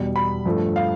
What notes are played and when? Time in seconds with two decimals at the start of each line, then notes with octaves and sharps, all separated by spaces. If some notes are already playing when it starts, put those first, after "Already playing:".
Already playing: E2 B2 G3
0.16 B5
0.46 G2 F3 A3
0.76 F5